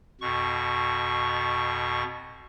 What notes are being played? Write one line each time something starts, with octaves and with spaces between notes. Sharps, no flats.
F2 B2 C#6